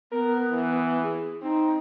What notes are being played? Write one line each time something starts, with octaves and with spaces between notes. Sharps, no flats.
B3 A#4
E3
G#4
C4 D#4